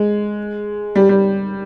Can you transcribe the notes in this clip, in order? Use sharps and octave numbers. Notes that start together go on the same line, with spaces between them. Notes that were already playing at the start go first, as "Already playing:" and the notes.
Already playing: G#3
G3
G3